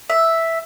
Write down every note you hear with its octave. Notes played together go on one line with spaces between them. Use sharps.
E5